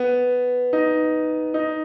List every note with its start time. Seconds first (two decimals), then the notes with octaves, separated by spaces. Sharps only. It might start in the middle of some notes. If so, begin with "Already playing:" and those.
Already playing: B3
0.73 D#4
1.54 D#4